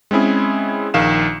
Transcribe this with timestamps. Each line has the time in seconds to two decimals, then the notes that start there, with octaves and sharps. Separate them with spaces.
0.11 G#3 C4 C#4 E4 G#4
0.94 A#1 D#3 F5 E7